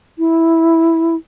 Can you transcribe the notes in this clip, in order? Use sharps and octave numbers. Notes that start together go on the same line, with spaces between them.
E4